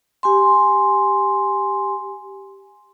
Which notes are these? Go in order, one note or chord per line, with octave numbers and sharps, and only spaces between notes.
G4 G#5 C6